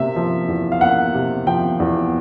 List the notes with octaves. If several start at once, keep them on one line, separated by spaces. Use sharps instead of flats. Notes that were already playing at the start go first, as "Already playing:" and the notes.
Already playing: C3 A#3 E5
F3
E2
F5
A#3 F#5
C3
F3 G5
E2